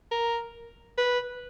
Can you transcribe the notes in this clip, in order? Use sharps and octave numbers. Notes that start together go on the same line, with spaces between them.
A#4
B4